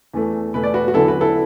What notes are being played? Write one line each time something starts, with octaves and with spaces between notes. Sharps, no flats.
E2 E3 A3
E2 B2 A3 B4
D5
F#4 B4
F#4
E2 D3 F#3 E4 A4
F#4 B4
E4 A4